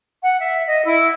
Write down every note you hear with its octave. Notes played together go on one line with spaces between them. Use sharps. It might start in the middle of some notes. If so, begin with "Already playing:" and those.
F#5
E5
D#5
E4